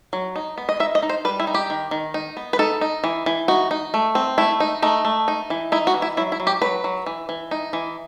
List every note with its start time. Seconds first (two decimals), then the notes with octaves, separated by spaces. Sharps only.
0.13 F#3
0.36 D#4
0.58 B3
0.69 D#5
0.80 D#4 E5
0.95 D#5
1.02 D#4
1.09 C5
1.25 G3 B4
1.40 E4
1.47 D#4
1.54 G4
1.70 D#3
1.91 D#3
2.14 D#4
2.37 B3
2.53 B4
2.59 D#4 A4
2.81 D#4
3.04 E3
3.26 E3
3.48 D#4 F#4
3.71 D#4
3.94 A3
4.15 C4
4.38 A3 E4
4.60 D#4
4.82 A3 D#4
5.05 A3
5.28 D#4
5.50 E3
5.72 D#4 E4
5.87 F#4
5.94 E3
6.02 E4
6.17 F#3 E4
6.32 E4
6.40 F#3
6.47 G4
6.62 F#3 B4
6.84 F#3
7.06 E3
7.29 E3
7.51 D#4
7.73 E3